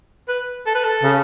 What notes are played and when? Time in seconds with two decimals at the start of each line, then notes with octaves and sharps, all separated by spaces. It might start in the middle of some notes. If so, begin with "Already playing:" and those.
0.28 B4
0.66 A4
0.75 B4
0.84 A4
1.03 C#3